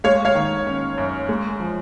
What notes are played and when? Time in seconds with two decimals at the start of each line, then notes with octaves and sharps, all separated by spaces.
0.04 G#3 C#5 F5
0.25 C#5 F5
0.35 D#3
0.67 C#4
0.98 F#2
1.29 G#3
1.60 F3